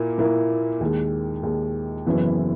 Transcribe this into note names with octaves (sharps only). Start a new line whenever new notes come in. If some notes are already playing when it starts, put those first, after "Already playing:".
Already playing: A#2 A#3 E4 A#4
A#2 A#3 E4 A#4
D#2 D#3 G#3
D#2 D#3 G#3
F#1 F#2 E3 B3 E4